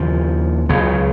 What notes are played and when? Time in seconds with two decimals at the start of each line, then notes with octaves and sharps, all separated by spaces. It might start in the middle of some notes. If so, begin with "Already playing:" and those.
Already playing: D#2 C#3 F3
0.69 C#2 C#3 F#3